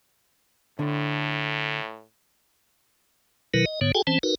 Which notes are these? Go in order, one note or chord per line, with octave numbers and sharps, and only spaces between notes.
A2 D3
B2 D#3 F#3 E4 A#4 B4
D#5
G#2 D3 B3 C#5
F#4 G#4 A4 G5 G#5
E3 C4 C#4 C5 A5
D#4 F#4 A#4 B4